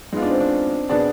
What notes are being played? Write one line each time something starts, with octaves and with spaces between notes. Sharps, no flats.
G#3 B3 D#4 F4
D4
C4
D4
B2 B3 D4 G#4 D5